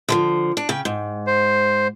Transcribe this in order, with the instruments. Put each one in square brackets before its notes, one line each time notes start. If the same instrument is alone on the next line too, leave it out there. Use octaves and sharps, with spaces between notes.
[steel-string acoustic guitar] D3 E3 F3
D4
C#3 G5
G#2
[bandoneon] C5